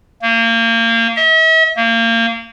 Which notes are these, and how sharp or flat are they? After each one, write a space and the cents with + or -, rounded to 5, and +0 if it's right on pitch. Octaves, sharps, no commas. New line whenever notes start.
A#3 -30
E5 -45
A#3 -30